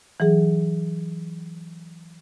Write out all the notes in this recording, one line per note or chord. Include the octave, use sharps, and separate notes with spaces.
E3 F#3 G#4